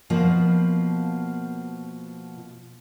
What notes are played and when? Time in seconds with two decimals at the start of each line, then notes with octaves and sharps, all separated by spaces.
0.10 B2 F3 A#3